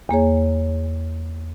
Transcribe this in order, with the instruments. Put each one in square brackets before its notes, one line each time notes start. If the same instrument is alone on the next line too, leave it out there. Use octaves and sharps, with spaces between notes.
[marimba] E2 A#3 G#4 C#5